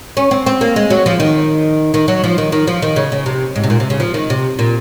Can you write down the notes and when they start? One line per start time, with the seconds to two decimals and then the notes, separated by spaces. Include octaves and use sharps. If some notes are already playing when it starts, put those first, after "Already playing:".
0.17 C#4
0.31 C4
0.46 C4
0.61 A#3
0.76 G#3
0.90 F#3
1.06 F3
1.20 D#3
1.94 D#3
2.08 F#3
2.24 F3
2.38 D#3
2.52 D#3
2.67 F3
2.82 D#3
2.96 C#3
3.12 C#3
3.26 C3
3.56 G#2
3.64 C3
3.70 A#2
3.80 C3
3.90 C#3
4.00 F3
4.14 D#3
4.30 C3
4.59 A#2